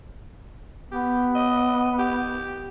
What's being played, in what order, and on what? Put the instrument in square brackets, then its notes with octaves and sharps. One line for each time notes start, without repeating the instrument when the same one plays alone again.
[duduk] B3 [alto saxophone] G4
[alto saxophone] D#5
G4